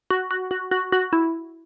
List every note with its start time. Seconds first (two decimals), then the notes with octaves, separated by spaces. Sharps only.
0.10 F#4
0.31 F#4
0.51 F#4
0.71 F#4
0.92 F#4
1.13 E4